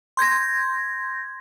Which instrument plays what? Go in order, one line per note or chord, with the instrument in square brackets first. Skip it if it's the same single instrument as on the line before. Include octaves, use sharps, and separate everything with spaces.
[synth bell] C6 G6 G#6 A#6